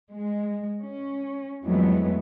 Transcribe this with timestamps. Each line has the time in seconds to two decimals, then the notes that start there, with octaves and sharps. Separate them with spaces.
0.12 G#3
0.81 C#4
1.66 F2 E3 F#3 G#3 A3 B3